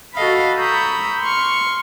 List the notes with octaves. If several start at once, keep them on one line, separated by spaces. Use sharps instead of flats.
F#4 A4 D#5 F5 B5
A#5 B5 C#6 D#6 E6 G6
C6 C#6 F6